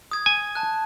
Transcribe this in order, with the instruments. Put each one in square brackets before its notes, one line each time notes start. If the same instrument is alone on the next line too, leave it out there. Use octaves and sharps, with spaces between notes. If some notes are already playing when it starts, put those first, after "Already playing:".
[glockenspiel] D#6 G#6
[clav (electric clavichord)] G#5
[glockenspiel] A5 F#6